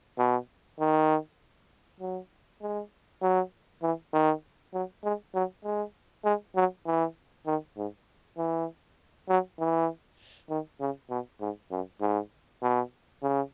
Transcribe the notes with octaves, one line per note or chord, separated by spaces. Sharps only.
B2
D#3
F#3
G#3
F#3
E3
D#3
F#3
G#3
F#3
G#3
G#3
F#3
E3
D#3
G#2
E3
F#3
E3
D#3
C#3
B2
G#2
F#2
G#2
B2
C#3